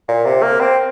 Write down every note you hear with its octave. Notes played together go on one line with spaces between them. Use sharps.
A#2
C3
A#3
C4